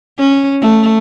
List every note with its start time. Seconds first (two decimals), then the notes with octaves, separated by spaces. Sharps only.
0.19 C#4
0.61 A3